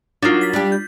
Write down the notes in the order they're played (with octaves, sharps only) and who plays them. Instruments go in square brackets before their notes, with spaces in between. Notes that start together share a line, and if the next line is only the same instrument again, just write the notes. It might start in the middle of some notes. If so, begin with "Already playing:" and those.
[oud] F#3 A#4 [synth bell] D4 D#4 F4
[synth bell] A6 B6
[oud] G3 D4 G4
[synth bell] G6